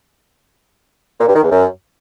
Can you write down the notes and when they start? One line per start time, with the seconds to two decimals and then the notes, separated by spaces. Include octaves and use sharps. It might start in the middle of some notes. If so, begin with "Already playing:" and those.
1.20 A#2
1.28 G2
1.35 D#3
1.43 E2
1.51 F#2